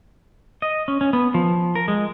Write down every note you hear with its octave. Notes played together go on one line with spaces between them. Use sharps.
D#5
C#4
C#4
B3
F3
A#4
G#3